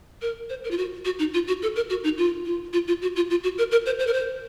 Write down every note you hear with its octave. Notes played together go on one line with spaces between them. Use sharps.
A#4
C5
A#4
F4
F#4
F#4
D#4
F4
F#4
A4
A#4
F#4
D#4
F4
F4
F4
F4
F#4
F4
F4
F#4
A#4
A#4
C5
C5
A#4
C5